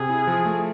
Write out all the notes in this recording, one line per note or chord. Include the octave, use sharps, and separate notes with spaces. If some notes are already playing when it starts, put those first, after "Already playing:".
Already playing: C3 G#4
E4
F3
A3